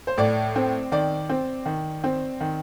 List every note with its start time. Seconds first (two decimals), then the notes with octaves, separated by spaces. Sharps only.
0.07 C5
0.18 A2 D5
0.56 C4
0.92 D#3 D5
1.29 C4
1.66 D#3
2.04 C4
2.40 D#3